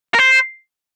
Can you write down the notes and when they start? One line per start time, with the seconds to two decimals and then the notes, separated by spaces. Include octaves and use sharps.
0.14 A#4
0.19 C5